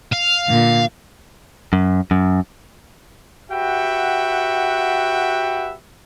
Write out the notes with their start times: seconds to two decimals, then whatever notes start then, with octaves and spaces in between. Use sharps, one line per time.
0.13 F5
0.47 A#2 D3
1.73 F#2
2.11 F#2
3.51 F#4 G4 B4 E5 F#5 G5